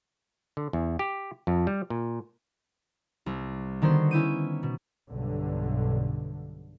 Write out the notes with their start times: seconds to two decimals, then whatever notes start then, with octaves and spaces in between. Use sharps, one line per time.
0.57 D3
0.73 E2
0.99 G4
1.47 F2
1.67 G3
1.90 A#2
3.26 C2
3.82 D3 D#3 B3 F#4 C5
4.11 C#4 E4 G6 D#7
4.63 B2
5.10 B1 G2 D3